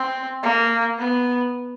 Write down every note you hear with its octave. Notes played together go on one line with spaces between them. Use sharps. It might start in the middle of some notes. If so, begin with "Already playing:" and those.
Already playing: C4
A#3
B3